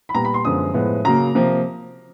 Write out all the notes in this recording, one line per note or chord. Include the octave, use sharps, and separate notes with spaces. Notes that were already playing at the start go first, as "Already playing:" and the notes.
B5
A#2 G3 B3 A#5
B5
C6
F#2 D3 F3 G#3 B3 D#6
A2 F3 G#3 B3
C#3 F#3 A#3 A#5
C3 F3 A#3